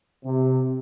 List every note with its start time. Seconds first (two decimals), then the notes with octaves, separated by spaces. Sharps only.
0.24 C3